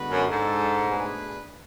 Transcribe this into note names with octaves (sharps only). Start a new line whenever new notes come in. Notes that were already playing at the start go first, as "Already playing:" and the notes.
Already playing: D3 G#3 B3 F#4 B4
F#2
G#2 G#3 D4 A4
B2 A3 D4 G#4 B4